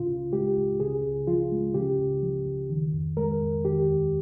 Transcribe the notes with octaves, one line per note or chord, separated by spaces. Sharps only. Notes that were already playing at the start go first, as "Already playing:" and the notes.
Already playing: C#3 F4
C#2
G#3 G4
C#2
C#3 G#4
C#2
F3 F4
G#3
C#3 G4
C#2
F3
C#2
D#3
F2
G#3 A#4
F2
D#3 G4
D#2